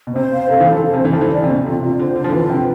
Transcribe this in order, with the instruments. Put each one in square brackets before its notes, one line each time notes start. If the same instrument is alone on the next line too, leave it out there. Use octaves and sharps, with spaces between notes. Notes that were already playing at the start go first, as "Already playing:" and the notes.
[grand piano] B2
[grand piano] C3 [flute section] C5
[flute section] F5
[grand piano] C3 [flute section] A4
[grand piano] E3
[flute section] A4
[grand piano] F3
[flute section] C5
[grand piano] C3
[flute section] C5
[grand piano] E3
[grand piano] F3 [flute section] A4
[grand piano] E3
[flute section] D5
[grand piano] C3
[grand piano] B2 [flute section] D4
[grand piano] C3 [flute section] F4
[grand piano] C3 [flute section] F4
[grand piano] D3 [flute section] C5
[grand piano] D3 [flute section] F4
[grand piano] F3
D3
[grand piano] E3 [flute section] B4
[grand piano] D3
[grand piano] C3 [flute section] G5